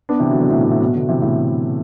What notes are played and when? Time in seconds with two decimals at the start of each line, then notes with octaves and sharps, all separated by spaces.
0.09 B3 D4
0.19 C3 E3
0.30 D3 F#3
0.40 B2 D3
0.50 A2 C3
0.61 A2
0.71 A2
0.81 B2
0.95 B2 D3
1.09 C3 E3
1.22 A2 C3